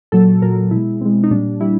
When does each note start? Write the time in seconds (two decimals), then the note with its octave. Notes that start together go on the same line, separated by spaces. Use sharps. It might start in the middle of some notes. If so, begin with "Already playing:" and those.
0.12 A#2 F#3 A4
0.42 A#2 F#3 A#4
0.57 A#4
0.71 B2 G#3 E4
1.01 B2 G#3 C4
1.23 D#4
1.31 A#2 G3 D4
1.61 G3 E4